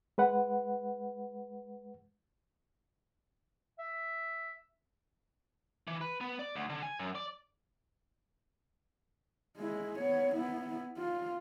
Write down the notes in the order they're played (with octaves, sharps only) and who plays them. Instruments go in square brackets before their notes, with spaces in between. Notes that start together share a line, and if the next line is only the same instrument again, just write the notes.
[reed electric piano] G#3 B4 F#5
[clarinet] E5
[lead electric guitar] E3
B4
B3
D5
D2
D3
G#5
F#2
D5
[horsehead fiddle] G#3 E4
B3 C#5
B3 E4
F4